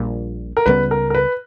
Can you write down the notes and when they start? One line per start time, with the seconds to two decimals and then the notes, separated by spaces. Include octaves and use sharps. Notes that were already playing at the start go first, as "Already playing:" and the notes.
Already playing: A#1 A#2 G3
0.57 A#4
0.66 C#2 C#3 G3 B3 B4
0.91 A#4
1.10 A#4
1.15 B4